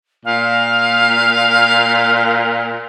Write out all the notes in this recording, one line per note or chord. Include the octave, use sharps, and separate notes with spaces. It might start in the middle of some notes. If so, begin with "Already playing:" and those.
A#2 F5